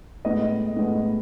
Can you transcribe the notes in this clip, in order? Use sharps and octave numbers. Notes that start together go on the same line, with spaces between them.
A2 G#3 B3 D#5
A2 G#3 B3